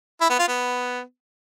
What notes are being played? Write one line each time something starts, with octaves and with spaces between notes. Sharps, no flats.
E4
B3
F4
B3